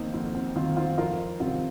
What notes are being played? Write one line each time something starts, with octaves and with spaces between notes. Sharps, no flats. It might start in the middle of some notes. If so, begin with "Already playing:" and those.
Already playing: F2 D#3 A#3 C4 D#4
F2 C4
C4
D#3 C4 F4
C4 F4
F2 F4 A#4
C3 D#3 C4 F4